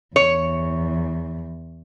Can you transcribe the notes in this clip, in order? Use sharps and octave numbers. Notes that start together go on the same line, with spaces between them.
E2 C#5